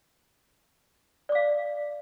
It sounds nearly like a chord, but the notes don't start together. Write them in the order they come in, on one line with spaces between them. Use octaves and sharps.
D5 D6 F5